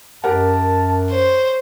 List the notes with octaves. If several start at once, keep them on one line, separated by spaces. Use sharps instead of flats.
F#2 G4 A#4 F#5 A5
C5 C#5